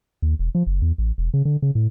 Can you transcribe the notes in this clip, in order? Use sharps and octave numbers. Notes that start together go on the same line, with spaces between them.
D#2
E1
F3
F#1
E2
A1
E1
C#3
D3
C#3
A2